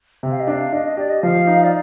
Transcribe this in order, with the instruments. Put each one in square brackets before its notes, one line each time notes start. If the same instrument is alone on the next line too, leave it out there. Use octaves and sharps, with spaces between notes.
[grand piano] C3
[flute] F5
D#5
[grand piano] D4 [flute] F5
[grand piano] D4 [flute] D#5
[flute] D#5
[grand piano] G4 [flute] D5
[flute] D#5
[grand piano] F3 [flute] F5
[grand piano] D#4
[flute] D5